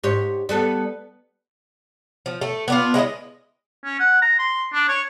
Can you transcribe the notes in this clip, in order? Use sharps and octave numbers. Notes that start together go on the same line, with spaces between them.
G#2 G4 C#5
G3 B3 A4
F3
A3 A4
B3 D4 F4
G#3 E4 A4 D#5
C#4
F#5
A#5
C6
D4
C#5